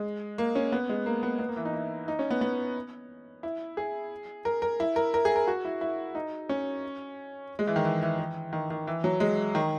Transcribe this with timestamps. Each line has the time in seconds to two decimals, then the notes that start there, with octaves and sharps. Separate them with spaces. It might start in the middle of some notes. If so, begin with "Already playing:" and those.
Already playing: G#3
0.38 A#3
0.55 C#4
0.72 B3
0.89 G#3
1.06 A#3
1.23 B3
1.39 B3
1.49 A#3
1.57 E3
1.65 D#4
1.73 E4
2.08 D#4
2.19 C#4
2.30 B3
2.41 B3
3.43 E4
3.77 G#4
4.45 A#4
4.62 A#4
4.80 E4
4.96 A#4
5.14 A#4
5.25 G#4
5.36 A#4
5.47 F#4
5.65 E4
5.81 E4
6.15 D#4
6.49 C#4
7.59 G#3
7.67 E3
7.76 D#3
7.85 E3
8.02 E3
8.19 E3
8.53 D#3
8.70 D#3
8.87 E3
9.04 F#3
9.20 G#3
9.55 D#3